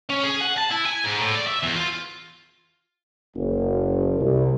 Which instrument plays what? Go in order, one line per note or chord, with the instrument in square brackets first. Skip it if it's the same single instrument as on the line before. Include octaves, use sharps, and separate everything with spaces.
[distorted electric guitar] C#4
G#4
F#5
A5
E4
G#5
G#2
A2
D5
E5
E2
F4
[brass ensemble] F#1
C2